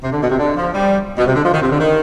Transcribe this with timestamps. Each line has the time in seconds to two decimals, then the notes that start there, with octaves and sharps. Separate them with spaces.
0.03 C3
0.12 D3
0.21 B2
0.30 C3
0.38 D3
0.56 F3
0.74 G3
1.18 B2
1.27 C3
1.35 D3
1.44 F3
1.53 D#3
1.62 C3
1.71 D3
1.80 D#3